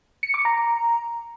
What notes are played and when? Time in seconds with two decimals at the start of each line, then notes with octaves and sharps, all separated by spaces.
0.23 C#7
0.34 D6
0.45 A#5